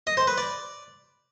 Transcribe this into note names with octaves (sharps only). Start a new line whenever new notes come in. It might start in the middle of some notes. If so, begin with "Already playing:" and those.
D#5
C5
B4
D5